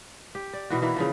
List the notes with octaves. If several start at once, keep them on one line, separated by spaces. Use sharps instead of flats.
G4
D5
B2 E3 F#4
E3 A#3 E4
C#3 E3 F3